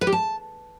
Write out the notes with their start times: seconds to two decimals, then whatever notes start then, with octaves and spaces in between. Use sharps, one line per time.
0.01 B4
0.07 G4
0.12 A5